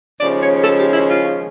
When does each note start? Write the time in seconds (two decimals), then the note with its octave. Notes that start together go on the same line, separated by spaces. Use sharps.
0.21 D#2 C#3 F3 G#3 C#4 D5
0.43 C#5
0.64 A4
0.78 G4
0.94 E4
1.09 F4